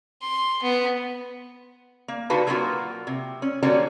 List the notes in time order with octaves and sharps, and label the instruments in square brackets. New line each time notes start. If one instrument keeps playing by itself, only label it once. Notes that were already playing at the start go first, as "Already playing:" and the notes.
[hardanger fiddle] C6
B3
[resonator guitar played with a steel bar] A#3
D3 D#4 F#4 B4 F5 A5
F#3 G#3 A#3 C#4 F4 F#4
C3
C#4
D3 F#3 G3 A#3 C#4 F#4